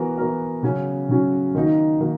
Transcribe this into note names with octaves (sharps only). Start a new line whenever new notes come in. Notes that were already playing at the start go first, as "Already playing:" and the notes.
Already playing: E3 B3 F#4 A#4
E3 B3 F#4 A#4
C#3 F#3 C#4 F#4
C#3 F#3 C#4 F#4
D#3 A#3 D#4 F#4
D#3 A#3 D#4 F#4